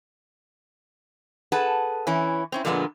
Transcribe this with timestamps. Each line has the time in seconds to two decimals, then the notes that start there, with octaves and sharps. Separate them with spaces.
1.52 G#4 A4 B4 F#5 A5
2.07 E3 C#4 E4
2.52 C4 C#4 E4
2.65 A#2 D3 F3 G#3 A#3 B3